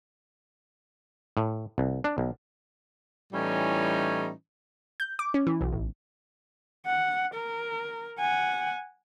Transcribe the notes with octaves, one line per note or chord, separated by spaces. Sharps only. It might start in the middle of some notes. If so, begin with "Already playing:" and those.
A2
C2
D4
B1
A2 E3 G3 C#4 D#4
G6
D6
C#4
E3
B1
A1
F#5
A#4
F#5 G#5